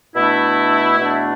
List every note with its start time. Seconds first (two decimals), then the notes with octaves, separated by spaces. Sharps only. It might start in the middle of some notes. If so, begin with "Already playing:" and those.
0.16 B2 A3 D4 E4
0.98 E2 B2 A3 D4